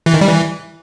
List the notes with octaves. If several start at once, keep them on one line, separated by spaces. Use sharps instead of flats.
E3
D#3
G3
E3